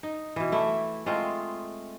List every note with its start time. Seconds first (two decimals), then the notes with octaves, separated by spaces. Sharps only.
0.03 D#4
0.36 B2 E3
0.52 A3 E4
1.06 G#3 A3 C4 F4